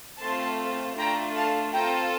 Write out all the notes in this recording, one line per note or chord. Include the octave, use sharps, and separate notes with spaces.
A3 C4 F4 A4 A5 C6
A3 D4 F4 A4 G5 A#5
F5 A5
C4 F4 A4 G5 A#5